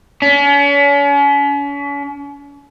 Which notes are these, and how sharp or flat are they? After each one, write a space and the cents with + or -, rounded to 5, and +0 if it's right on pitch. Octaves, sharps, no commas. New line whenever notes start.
C#4 +40